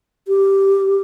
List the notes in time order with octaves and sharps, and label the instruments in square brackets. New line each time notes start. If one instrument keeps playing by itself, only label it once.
[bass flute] G4